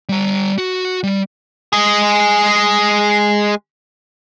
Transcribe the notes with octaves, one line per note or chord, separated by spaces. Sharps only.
G3 A#5
F#4
G3
G#3 G#4